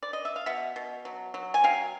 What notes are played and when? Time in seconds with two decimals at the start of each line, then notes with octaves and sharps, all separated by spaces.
0.03 D5
0.13 D#5
0.25 E5
0.36 F5
0.46 B2 E5 F#5
0.76 B2
1.05 F#3
1.34 F#3
1.54 G#5
1.64 F#3 F5 G5